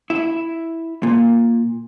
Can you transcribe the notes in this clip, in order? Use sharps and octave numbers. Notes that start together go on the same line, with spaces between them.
E4
A#2